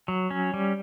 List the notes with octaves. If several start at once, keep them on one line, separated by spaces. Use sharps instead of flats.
F#3
C#4
G3